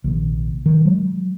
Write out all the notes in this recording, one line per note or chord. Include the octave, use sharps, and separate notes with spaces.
A#1 C3 D#3
D#3
F#3 G#3